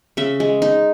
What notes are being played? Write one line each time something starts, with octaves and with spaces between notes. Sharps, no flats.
C#3 E5
G#3
D#4